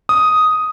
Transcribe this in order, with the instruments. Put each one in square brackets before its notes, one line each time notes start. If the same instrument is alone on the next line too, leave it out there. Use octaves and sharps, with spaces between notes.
[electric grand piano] D#6